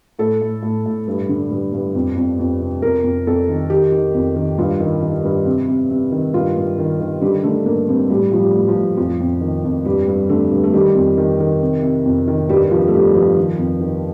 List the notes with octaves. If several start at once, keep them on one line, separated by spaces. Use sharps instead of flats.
A2 A4
A2
A2
A2
G2
D3
G2
G2
F2
F2
F2
C3
F2 A#4
F2
F2 A4
D#3
D#3 G4
D#3
F2
D#3
G2 F4
D#3
D#3
G2
C3
C3
C3
D#3
G2 F4
G2
D#3
D#3
D3 G3
D3 A3
G2 A#3
G2 C4
A2 G3
A2 F3
G3
A2
F3
A2
F2 F3
F2
D#3
F2
G2 G3
G2
D3 A3
G2
A3
D#3 G3
F2
D#3
D#3
C3
C3
F2
D#3
G2 G3
G2 F3
A3
G2 G3
G2 F3
D#3
F2
D#3